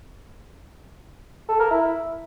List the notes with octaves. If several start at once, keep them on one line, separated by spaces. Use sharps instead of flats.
A4
A#4
E4